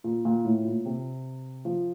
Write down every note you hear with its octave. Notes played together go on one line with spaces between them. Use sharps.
A#2
A#2
A2
A#2
C3
F3